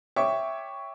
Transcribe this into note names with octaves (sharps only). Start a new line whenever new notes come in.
C#5 E5 G5 C#6 D6